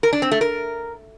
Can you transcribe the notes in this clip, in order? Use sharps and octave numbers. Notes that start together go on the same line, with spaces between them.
A#4
D4
C4
A3
A#4